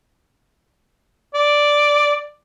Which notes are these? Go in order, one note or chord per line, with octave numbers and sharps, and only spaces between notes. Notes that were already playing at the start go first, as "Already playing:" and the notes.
D5